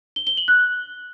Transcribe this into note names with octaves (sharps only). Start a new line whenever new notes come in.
G7
G7
F#7
F#6